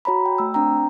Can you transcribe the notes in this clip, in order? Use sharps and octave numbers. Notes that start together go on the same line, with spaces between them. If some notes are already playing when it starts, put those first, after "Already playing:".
F#4 C#5 A#5 B5
G5
A3 E6
C4 D4 G5 A#5